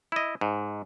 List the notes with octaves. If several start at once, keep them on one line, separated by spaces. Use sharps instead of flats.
E4 D#5
G#2